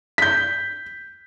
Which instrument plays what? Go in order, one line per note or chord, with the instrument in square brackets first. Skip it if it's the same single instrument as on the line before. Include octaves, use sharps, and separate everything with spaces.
[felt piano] G6 B6